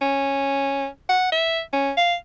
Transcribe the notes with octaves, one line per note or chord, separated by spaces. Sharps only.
C#4
F#5
E5
C#4
F5